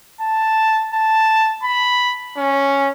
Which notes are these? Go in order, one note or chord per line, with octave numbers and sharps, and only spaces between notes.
A5
A5
B5
C#4